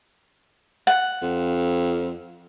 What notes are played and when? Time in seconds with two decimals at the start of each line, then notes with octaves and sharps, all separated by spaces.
0.87 F#5
1.22 F2